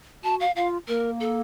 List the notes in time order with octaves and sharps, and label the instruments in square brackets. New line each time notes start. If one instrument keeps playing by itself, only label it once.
[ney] F#4 [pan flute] A5
[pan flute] F5
[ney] F4 [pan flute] F5
[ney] A#3 [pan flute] A#4
[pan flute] A4